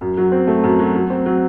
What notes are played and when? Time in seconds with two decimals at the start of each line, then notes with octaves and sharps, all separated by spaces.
0.01 F#2
0.17 F#3
0.32 C4
0.47 A3
0.64 F#2
0.79 F#3
0.95 F#3
1.10 C4
1.26 F#3